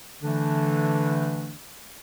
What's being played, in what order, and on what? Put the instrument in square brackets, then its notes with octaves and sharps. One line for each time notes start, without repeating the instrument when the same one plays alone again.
[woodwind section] D3 E3 A3 D4